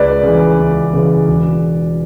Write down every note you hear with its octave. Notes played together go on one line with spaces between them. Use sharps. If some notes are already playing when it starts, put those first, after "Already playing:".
Already playing: C#2 B4 D5
C#3 E3
C#2
C#3 E3
E1